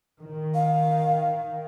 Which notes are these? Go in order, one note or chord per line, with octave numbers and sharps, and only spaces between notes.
D#3
F5